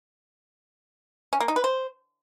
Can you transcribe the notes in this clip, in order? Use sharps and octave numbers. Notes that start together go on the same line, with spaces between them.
C#4
A#3
D#4
B4
C5